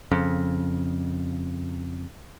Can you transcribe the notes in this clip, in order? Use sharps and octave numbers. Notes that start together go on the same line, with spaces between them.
F2 C#3